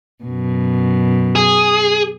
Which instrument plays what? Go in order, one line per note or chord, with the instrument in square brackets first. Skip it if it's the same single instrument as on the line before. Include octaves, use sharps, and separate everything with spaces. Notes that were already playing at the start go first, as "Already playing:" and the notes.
[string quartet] F#2 B2
[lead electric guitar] G#4